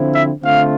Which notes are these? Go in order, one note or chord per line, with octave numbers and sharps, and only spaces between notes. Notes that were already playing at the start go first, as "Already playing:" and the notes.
Already playing: D3 F3 C4 E4
E5
D3 A3 C4 F4 F5